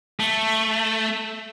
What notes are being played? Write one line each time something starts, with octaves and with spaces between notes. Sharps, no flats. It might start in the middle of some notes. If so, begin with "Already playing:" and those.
A3